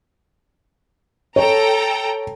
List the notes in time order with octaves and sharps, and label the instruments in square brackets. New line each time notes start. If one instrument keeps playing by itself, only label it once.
[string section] A4 G5 A#5 [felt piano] C#5